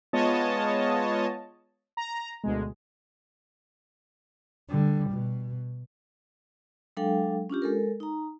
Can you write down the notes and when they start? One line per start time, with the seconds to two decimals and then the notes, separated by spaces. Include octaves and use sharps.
0.13 G#3 B3 F4 C#5 D#5 A5
1.97 A#5
2.44 D2 B2 G#3
4.69 D3 G3
5.10 B2
6.97 F#3 G#3 D4 A4 F5 G5
7.50 C#4 D4 F4 G4
7.62 G#3 A4 A#4
8.00 D#4 A#5